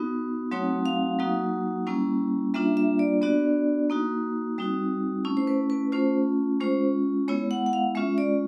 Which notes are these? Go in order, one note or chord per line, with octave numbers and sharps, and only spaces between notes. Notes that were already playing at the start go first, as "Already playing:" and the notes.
Already playing: B3 D#4 F#4
F#3 A3 C4 D#4 F#4 C#5
F5
F#3 A#3 D#4 F#4
G3 A#3 C#4 E4
G3 A#3 D4 F4 E5
E5
D5
B3 D4 F#4 D5
A#3 D#4 F#4
G3 C4 D#4 F#4
A3 C#4 E4
C5
B4
B4
A3 C#4 F4 C5
G#3 C#4 F4 C5
G#3 B3 E4 C#5
F#5
F#5
F5
G#3 C#4 F4 E5
D5